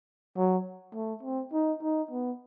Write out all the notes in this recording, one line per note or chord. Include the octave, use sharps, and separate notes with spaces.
F#3
A3
C4
D#4
D#4
B3